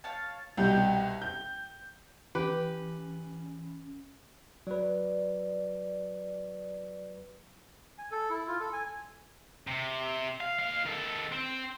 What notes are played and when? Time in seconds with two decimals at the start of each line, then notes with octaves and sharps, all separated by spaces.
0.04 C#5 F5 A5
0.57 C2 B2 G3 G5
1.22 G6
2.35 E3 C#4 G4 B4
4.67 F#3 B4 D5
7.98 G#5
8.12 A4
8.30 E4
8.48 F4
8.60 A4
8.73 G#5
9.67 C3
10.41 F5
10.58 D#2 F5
10.86 D#3 A4
11.32 C4